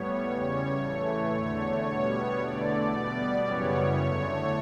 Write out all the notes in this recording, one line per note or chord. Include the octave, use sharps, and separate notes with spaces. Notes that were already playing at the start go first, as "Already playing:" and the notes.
Already playing: A2 G3 B3 C#5
E2 C#3 G3
A2 E3 A3
E2 D3 A3 C#5
B2 G3 B3 C#5
E2 D3 A3 D5
B2 G3 B3 D5
F#2 C#3 E3 G3 B3 C#5
E2 D3 A3